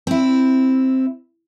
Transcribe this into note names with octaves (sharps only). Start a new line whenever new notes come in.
C4 E4